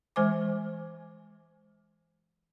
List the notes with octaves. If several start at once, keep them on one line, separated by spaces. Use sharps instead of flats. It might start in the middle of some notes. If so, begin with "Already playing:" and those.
E3 G#3 C5 G#5 D6